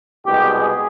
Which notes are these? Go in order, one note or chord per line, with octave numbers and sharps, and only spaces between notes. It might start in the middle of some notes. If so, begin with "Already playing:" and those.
C2 B2 G#3 G4
G#4